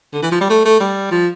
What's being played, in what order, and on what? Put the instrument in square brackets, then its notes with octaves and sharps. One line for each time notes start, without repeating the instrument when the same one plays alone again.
[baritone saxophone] D3
E3
F3
G3
A3
A3
G3
F3